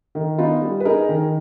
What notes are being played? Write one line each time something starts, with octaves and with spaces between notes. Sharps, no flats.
D#3
B3 D#4 F4
G3
B4
D#4 G#4 A#4
D#3